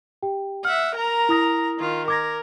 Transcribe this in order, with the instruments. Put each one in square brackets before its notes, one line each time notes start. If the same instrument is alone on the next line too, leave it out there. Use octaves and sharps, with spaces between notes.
[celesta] G4 G5
[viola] E5 F#5 [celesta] F6
[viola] A#4 A#5
[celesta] E4 D#6 A#6
[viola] D#3 F4
[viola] A#4 [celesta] D6 G#6 A#6